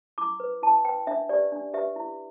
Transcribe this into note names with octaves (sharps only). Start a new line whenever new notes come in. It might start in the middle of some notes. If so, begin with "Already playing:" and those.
E4 D6
B4
E4 A5
B4 G5
D4 E5
G4 B4 D5
D4
G4 B4 E5
E4